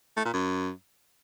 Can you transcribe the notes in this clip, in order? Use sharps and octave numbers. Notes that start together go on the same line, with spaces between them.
A3
A#2
F#2